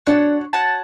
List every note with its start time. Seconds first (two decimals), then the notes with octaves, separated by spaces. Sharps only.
0.07 D4 F#4 C#5 F#5 A5
0.53 F#4 C#5 F#5 A5